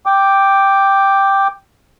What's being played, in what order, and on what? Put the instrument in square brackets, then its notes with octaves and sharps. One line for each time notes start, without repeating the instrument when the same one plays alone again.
[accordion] G5 D6